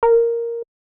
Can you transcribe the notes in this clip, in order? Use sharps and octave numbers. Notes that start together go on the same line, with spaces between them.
A#4